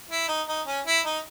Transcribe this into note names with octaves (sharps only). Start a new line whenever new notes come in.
E4
D#4
D#4
C#4
E4
D#4